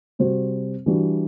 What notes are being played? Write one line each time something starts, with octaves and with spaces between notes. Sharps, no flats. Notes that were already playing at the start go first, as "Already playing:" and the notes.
C3 G3 C4 F#4 C5
E3 G3 D4 F#4